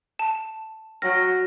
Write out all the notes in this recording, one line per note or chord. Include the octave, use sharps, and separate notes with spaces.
A5
F#3 F6 A#6